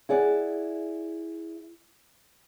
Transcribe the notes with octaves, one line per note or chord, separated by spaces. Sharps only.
E4 G#4 D5 F#5